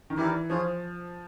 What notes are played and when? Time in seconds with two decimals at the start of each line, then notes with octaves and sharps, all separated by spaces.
0.10 D#3
0.17 E3 E4 G4 A#4 D5
0.50 F3 F4 G#4 C#5